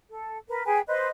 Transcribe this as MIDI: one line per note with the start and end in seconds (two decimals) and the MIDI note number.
0.10 0.37 69
0.48 0.63 70
0.48 0.63 71
0.66 0.80 68
0.66 0.80 71
0.66 0.80 79
0.66 0.80 80
0.87 1.08 71
0.87 1.08 72
0.87 1.08 75